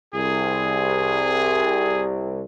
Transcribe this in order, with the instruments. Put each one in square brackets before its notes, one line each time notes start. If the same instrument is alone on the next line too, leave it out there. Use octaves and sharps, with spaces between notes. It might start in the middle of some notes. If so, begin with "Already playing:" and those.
[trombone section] C2 [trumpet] G#4